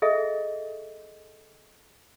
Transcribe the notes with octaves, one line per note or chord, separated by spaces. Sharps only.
G#4 A4 D#5 E5